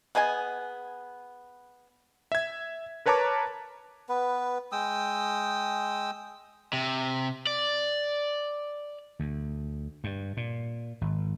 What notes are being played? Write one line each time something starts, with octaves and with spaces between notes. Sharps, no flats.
B3 G#4 D#5 G#5
E5 G#6
A#4 B4 C#5 A5 A#5 D6
B3 B4
G#3 G5 D#6 E6
C3
D5
D2
G2
A#2
G#1